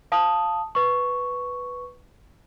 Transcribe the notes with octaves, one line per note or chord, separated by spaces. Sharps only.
F5 A5 D#6
B4 C#6